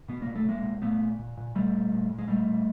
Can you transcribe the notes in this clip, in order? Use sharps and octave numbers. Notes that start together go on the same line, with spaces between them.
B2 B3
B2 A#3
A3
B2 G#3 A#3
B2
A#2 A3 B3
A#2
A#2
A#2
A#2 G3 A3
A#2
A#2
A#2
G#3
A#2 G3 A3
A#2